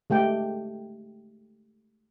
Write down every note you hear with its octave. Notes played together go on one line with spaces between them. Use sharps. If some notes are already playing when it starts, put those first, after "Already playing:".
G#3 A3 G4 G5